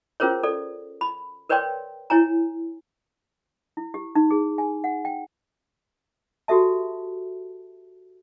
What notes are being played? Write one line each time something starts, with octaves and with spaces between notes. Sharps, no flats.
C#4 F4 G#4 A#4 C5 C#5
A4 D5
B5
A#4 B4 C#5 D5 G5 C6
E4 C#5 G#5 A#5
E4
G4
D#4
G#4
G#5
F#5
G5
F#4 G4 A4 E5 A5